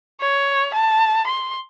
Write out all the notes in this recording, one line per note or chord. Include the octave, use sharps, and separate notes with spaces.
C#5
A5
C6